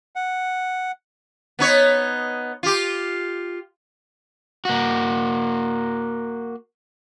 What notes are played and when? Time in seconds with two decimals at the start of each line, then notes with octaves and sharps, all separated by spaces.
0.16 F#5
1.59 B3 D#4 C#5
2.63 F4 G4
4.65 A#3 F#4